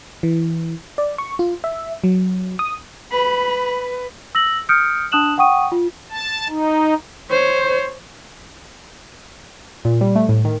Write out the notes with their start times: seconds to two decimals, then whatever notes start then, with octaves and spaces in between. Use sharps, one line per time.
0.23 E3
0.98 D5
1.18 C#6
1.39 F4
1.64 E5
2.04 F#3
2.59 D#6
3.12 B4 B5
4.35 E6 A#6 F#7
4.69 D#6 F6 G6 C#7 D7
5.12 D4 A5 D#6 F#6 E7 F#7
5.38 F#5 G5 C#6 D#6 D#7
5.72 F4
6.10 A5
6.49 D#4
7.31 C5 C#5
9.85 A#2
10.01 G3
10.15 A3
10.29 A2
10.45 D#3